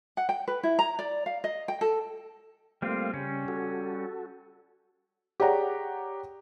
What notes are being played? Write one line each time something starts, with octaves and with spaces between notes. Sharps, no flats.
F#5
G5
B4
E4
A#5
D5
F5
D#5
G5
A4
G3 A3 A#3 C4 F4 F5
C#3 G3 C#4
F#4 A4
G4 G#4 C#5 D5 F#5 A#5